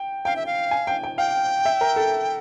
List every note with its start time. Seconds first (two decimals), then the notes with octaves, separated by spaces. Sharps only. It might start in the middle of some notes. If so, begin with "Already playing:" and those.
Already playing: G5
0.25 F5 G5
0.36 E5
0.46 F5
0.71 G#5
0.87 G5
1.03 G5
1.18 F5 G5
1.65 E5
1.81 A#4
1.96 A4